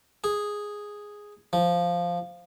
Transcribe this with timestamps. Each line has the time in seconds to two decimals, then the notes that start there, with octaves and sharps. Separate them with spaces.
0.24 G#4
1.53 F3